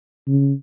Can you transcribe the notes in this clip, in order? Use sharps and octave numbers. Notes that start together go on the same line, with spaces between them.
C#3